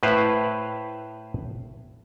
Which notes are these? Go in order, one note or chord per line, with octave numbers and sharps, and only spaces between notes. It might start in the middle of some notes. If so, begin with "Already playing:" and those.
A2 E4 B4 C5 F5